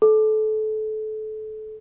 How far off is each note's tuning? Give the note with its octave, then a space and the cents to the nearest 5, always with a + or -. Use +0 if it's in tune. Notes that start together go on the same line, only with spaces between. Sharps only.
A4 -25